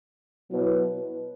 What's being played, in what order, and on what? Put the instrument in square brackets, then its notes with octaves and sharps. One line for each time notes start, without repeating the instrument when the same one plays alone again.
[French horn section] B2 F#3 B3 E4 B4